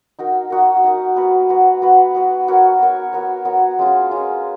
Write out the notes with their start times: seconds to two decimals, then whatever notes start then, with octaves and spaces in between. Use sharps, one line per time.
0.19 D#4 F#4 A#4
0.50 D#4 F#4 A#4
0.84 D#4 F#4 A#4
1.16 B3 F#4 B4
1.49 B3 F#4 B4
1.82 B3 F#4 B4
2.15 B3 F#4 B4
2.47 B3 F#4 A#4 C#5
2.80 B3 F#4 A#4 C#5
3.13 B3 F#4 A#4 C#5
3.45 B3 F#4 A#4 C#5
3.79 G#3 C#4 F4
4.11 G#3 C#4 F4